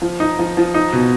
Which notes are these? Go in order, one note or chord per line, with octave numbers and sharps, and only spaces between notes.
F3
D#4
F3
F3
D#4
B2